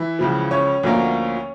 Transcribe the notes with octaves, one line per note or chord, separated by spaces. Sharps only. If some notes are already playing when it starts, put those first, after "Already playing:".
Already playing: E3 E4
C#2 C#3 F3
C#4 C#5
D2 D3 F3 A#3